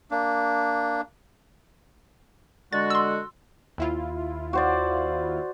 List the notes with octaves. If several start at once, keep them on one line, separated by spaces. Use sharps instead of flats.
A#3 D4
D3 G#3 F#4 A6
C6 E6
D#2 E4 F4
F#4 C5 D5